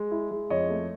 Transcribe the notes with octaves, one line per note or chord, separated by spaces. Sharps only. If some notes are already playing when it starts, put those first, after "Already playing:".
Already playing: G#3
E4
G#3
F2 C#5 D#5
A3